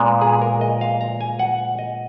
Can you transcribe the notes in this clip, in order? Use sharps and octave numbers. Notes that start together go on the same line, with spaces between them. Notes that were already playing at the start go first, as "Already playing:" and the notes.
Already playing: A#2 G#3 B3
G#4
A#4
D#5
F5
A#5
G#5
F#5
D#5